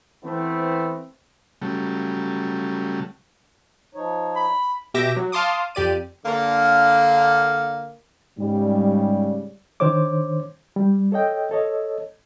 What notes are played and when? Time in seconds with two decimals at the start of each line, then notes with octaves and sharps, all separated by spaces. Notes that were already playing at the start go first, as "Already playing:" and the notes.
0.24 E3 A3 B3 C4
1.62 C#3 F#3 G3 A3
3.95 F3 D#4 C#5
4.36 B5
4.94 B2 G4 E5 D6 E6 A#6
5.17 F#3
5.32 F5 A5 C6 D6 D#6
5.75 F2 G4 D5 D#7
6.25 D3 A#3
8.39 G#2 C#3 G3
9.80 D#3 D4 C5 C#5 D6
10.76 G3
11.12 A4 C#5 D#5 G5
11.51 A4 C#5 D#5